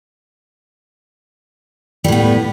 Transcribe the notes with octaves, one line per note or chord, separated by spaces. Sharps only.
A2 G3 B3